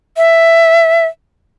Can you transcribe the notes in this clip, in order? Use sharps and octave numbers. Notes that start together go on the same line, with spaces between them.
E5